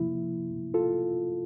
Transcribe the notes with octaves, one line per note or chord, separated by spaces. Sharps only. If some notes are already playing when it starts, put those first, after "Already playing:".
Already playing: C3 F3 A#3 E4
F4 A4